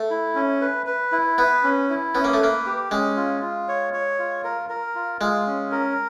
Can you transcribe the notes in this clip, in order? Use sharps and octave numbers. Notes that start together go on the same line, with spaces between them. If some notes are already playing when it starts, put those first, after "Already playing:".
Already playing: A3
E4
C#4
B4
B4
E4
B3 B4
C#4
E4
B3 C#4
A#3
A3
A#3 B4
G4
G#3 C#4
F4
F4
C#5
C#5
F4
A#4
A#4
F4
G#3 F4
C#4
A#4